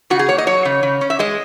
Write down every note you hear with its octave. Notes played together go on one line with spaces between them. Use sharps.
C#3 F#4
G#4
A#3 C#5
D#5
F#3 C#5
C#3
C#3
C#4
E5
G#3 D#5